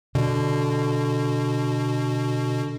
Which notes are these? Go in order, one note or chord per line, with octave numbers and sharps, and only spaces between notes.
B2 D3